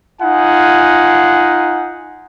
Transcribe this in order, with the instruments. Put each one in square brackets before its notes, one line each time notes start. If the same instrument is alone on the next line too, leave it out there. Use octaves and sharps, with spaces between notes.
[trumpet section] D#4 F4 F#5 G#5